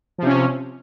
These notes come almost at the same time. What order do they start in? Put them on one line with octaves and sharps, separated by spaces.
F3 C3 C#4